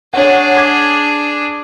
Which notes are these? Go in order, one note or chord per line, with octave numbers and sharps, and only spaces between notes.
D4 G#4 C#5 F#5
D6 G#6 B6